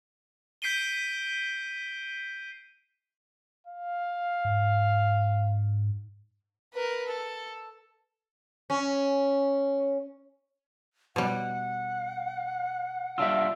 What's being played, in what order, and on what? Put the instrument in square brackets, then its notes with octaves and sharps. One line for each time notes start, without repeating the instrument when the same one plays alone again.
[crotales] G6 B6 C7 D7 D#7 G7
[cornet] F5
[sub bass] G#2
[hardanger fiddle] A#4 B4
A4
[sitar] C#4
[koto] B2 G3 [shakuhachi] F#5
[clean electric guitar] G3 D4 F4 [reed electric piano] E5 E6